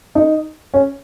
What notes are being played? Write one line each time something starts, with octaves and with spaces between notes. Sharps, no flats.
D#4
C#4